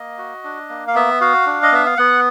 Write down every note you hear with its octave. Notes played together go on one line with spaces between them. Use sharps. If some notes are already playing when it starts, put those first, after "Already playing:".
Already playing: A#3 D#5
F#4
D4
A#3
F5
B3 E5
F#4 F5
D4
D#5
B3 E5
F5
B3 F#5